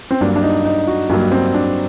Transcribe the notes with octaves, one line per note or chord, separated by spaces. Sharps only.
C4
G2 F#3 A#3 D4
D4
D#4
D#4
F#4
G2 F#3 A#3 D4
C4
D4